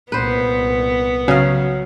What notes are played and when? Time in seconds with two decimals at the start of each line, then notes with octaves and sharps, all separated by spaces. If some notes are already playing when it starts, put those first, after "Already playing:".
0.12 C2 A#2 B3 B4 C5
1.28 C#3 F#3 F5